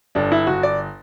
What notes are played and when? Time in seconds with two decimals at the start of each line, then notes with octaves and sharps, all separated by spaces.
0.15 G1 D4
0.32 E4
0.47 G1 F#4
0.63 D5